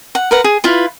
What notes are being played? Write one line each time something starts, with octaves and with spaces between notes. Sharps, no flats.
F#5
A#4 B4 F#5
G#4
E4 F4 B4